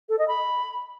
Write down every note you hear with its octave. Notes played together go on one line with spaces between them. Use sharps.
A4
D#5
B5